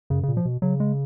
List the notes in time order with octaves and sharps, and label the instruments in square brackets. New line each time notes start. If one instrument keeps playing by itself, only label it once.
[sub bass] F#2 [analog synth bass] C#3
[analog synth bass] C#3
[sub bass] A#2
[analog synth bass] F3
[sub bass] B2
[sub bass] C#3 [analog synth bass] F#3
[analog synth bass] G#3